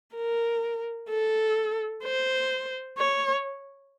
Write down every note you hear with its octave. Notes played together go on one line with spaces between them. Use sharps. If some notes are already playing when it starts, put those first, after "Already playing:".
A#4
A4
C5
C#5